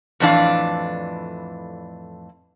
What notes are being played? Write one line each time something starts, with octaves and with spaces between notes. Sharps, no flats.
F2 A2 E3 D4 D5 F5